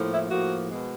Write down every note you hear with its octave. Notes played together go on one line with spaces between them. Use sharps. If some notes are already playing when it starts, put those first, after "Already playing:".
Already playing: A2 F3 A#3
E4
A2 F3 A#3 F#4
B2 G#3 B3